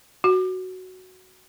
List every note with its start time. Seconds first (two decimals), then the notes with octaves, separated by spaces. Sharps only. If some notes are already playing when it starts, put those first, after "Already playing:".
0.24 F#4